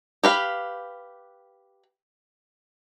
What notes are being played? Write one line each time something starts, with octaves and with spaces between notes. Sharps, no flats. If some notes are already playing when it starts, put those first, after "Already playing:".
G4 B4 F5